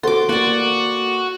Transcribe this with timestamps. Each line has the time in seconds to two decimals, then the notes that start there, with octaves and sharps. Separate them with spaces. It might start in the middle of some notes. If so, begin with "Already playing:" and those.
0.03 F#4 A4 C5 F#5 C6 D6
0.29 A#3 F#4 D5 F#5